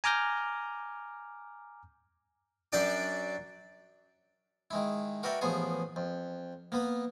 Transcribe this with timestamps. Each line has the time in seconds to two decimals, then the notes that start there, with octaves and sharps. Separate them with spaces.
0.04 G#5 A#5 D6 F6 G6 A#6
2.72 F#2 D4 D5 G5 D6
4.71 D#3 G#3 E4
5.23 F#4 A#4 B4 D5 E5 G5
5.41 A1 F3 B3 G#4 G#5
5.96 F2
6.72 A#3 B3 B4